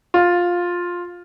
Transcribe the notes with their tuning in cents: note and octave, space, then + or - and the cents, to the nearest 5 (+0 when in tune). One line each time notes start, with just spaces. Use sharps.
F4 +10